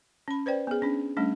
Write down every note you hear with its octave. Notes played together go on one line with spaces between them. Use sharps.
C#4 B5
B4 C5 D5 G5
B3 G#4
C#4 D4
G3 A3 C#4 D4